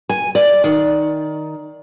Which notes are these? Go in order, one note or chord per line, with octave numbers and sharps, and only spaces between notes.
G#5
D5
D#3